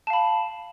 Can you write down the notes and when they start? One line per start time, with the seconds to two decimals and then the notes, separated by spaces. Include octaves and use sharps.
0.07 A5
0.10 F5
0.13 B5